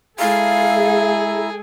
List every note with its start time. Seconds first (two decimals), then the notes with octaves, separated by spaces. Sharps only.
0.20 G#3 E4 G#4 A4 E5 F5 G#5 A#5